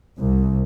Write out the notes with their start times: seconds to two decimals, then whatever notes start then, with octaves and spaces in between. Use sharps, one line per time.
0.18 C2